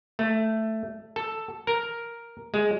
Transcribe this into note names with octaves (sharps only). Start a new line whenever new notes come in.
A3
A4
A#4
G#3